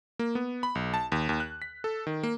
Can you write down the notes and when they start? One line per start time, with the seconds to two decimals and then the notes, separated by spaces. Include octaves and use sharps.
0.19 A#3
0.35 B3
0.63 B5
0.75 B1
0.94 A5
1.12 D#2
1.29 D#2
1.40 F#6
1.62 B6
1.84 A4
2.07 D#3
2.23 A#3